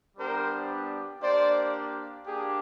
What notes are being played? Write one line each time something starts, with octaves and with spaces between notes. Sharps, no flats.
G3 B3 D4 G4 A#4 C5
A#3 D4 G4 C5 D5
A#3 D4 G4 G#4